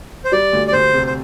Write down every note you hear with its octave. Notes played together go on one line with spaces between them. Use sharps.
C5
G3 D5
D2
D5
D2 C5
C3
C5